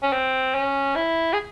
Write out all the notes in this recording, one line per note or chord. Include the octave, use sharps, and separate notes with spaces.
C#4
C4
C#4
E4
G#4